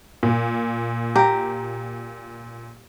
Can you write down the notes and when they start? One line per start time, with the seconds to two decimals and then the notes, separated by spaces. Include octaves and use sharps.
0.23 A#2
1.16 G4 A#5